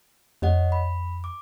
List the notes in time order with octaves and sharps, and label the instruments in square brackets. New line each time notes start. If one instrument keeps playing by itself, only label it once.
[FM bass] F2 [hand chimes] C#5 D#5 F#5
[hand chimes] B5
D6